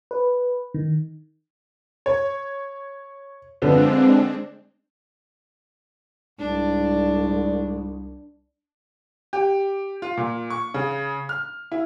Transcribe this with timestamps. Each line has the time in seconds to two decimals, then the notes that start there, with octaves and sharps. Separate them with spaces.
0.11 B4
0.74 D#3
2.06 C#5
3.62 D3 F3 G#3 B3 C4 D4
6.39 C2 G#2 D4
9.33 G4
10.02 F4
10.17 A#2
10.50 C#6
10.74 C#3
11.29 F6
11.72 E4